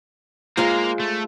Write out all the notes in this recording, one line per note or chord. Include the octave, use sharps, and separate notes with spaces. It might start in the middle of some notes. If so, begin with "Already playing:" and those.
G#3 A#3 F4 A#4 C5
A3